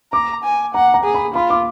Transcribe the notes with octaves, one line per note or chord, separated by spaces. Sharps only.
A#5 D6
G#5
F#5 A#5
A#5
G#4
B5
F4 B5
D6